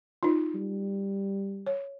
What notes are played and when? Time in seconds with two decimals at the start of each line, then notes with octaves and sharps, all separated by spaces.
0.23 D#4 F4
0.55 G3
1.66 C#5